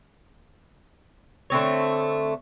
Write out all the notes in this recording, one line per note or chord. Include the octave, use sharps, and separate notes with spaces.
D3 A3 C4 C#5